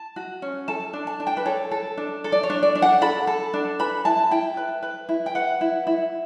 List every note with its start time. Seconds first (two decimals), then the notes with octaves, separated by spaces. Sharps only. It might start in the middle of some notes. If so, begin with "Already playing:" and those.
Already playing: A5
0.16 F#4
0.42 C#4
0.68 A4 A5
0.93 D4
1.07 A5
1.20 D4
1.27 G5
1.37 B4
1.45 A4 C#5
1.71 A4
1.97 D4
2.24 A4
2.32 D5
2.43 C#5
2.50 D4
2.63 D5
2.75 D4
2.82 F#5
3.02 A4 B5
3.27 A4
3.54 D4
3.79 B4 B5
4.05 E4 A5
4.31 E4 G5
4.57 B4
4.83 B4
5.09 E4
5.26 G5
5.35 B4 F#5
5.61 E4
5.87 E4